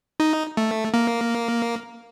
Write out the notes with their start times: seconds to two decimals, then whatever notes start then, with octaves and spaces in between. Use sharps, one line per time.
0.20 D#4
0.57 A3
0.94 A#3